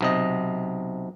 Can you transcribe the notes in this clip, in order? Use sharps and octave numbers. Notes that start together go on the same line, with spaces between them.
B1 C3 D#5